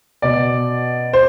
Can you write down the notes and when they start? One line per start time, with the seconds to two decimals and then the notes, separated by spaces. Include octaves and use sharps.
0.22 B2 D5
1.13 C5